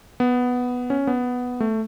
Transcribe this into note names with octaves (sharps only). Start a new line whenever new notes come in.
B3
C#4
B3
A3